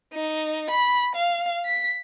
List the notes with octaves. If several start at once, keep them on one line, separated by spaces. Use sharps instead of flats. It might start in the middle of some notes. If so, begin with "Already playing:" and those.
D#4
B5
F5
B6